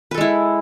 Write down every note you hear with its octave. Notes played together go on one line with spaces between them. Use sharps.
G#3 E4 A4 B4